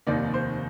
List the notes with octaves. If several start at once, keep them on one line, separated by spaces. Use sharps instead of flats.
F1 D#2 D#3 A#3 D5
C5